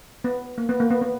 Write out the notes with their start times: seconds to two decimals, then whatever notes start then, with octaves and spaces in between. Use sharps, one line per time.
0.24 B3
0.58 A#3
0.69 B3
0.80 A#3
0.91 B3
1.01 B3